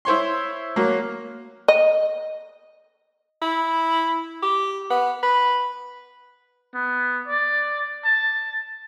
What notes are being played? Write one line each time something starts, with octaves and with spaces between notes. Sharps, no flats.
E4 C5 C#5 C6
F#3 A#3
D#5
E4
G4
B3
B4
B3
D5
A5